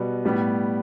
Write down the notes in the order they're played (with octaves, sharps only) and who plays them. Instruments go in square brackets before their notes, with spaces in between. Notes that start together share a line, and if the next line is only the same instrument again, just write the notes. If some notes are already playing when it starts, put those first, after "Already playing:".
Already playing: [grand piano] B2 G3 B3
A2 G3 B3